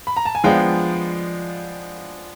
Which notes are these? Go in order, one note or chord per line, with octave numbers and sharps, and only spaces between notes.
B5
A#5
A5
G#5
F3 G#3 B3 D4 F5 G5